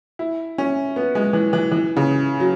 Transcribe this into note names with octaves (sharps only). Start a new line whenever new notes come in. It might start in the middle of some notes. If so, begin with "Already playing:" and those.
E4
C#4
B3
G#3
E3
E3
E3
C#3
F#3